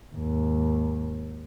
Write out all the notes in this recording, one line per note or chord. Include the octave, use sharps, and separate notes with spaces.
D#2 G#2